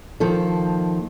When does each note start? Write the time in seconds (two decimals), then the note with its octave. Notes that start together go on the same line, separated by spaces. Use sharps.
0.20 D#3 F3 A#3 A4